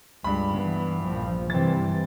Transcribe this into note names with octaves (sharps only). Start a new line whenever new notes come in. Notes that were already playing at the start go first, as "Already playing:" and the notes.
C#2 G2 B5
E3 B3
A#1 F3
G2 C3 E3 C4 A6